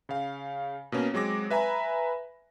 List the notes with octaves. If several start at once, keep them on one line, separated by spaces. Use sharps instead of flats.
C#3 F5
B2 A#3 C#4
F#3 G#3 C4 D6 A#6
B4 E5 G#5 A#5 B5